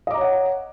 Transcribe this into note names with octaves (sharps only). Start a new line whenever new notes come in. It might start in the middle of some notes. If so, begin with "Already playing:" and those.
C#5 D#5 F#5 A#5 D6